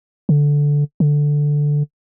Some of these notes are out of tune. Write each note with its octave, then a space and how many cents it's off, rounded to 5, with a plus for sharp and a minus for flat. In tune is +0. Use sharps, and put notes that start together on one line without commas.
D3 -10
D3 +0